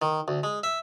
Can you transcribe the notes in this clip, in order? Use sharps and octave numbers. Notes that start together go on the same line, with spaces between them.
D#3
D2
G#3
E5